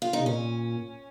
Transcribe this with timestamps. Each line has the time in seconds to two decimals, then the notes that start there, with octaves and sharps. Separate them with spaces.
0.02 F4
0.13 D#4
0.19 C3
0.26 A#2 C#4